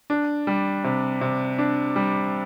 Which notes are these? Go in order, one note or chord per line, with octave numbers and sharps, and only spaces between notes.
D4
G3
C3
C3
D4
G3